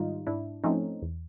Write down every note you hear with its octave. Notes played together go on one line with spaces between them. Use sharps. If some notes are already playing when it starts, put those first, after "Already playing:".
Already playing: G#2 D#3 G3 D#4 F4
G#2 D4 E4
F3 A3 C4 C#4 D#4
E2